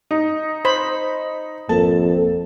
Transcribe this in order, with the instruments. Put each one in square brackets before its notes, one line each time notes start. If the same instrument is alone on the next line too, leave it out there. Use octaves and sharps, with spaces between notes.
[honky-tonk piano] D#4
[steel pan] C5 D#5 B5
[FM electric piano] G#1 A#3 A4 [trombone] F2 [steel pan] A5